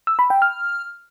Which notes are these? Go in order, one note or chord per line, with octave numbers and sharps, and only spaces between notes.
E6
B5
G5
F6